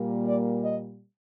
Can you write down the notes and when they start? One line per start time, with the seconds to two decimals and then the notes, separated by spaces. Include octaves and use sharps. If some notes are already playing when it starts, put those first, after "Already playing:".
Already playing: A#2 G3 A#3
0.25 D5
0.64 D#5